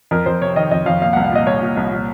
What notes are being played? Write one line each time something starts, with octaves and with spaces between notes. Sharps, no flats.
F2 A#4
F2 C5
C3 C#5
D#3 D#5
F2 D#5
F2 F5
A#2 F5
C2 F#5
F5
A#2 D#5
C2 C#5
A#2
C2
A#2